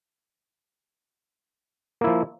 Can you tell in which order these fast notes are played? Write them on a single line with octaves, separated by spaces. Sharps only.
A#3 E4 F3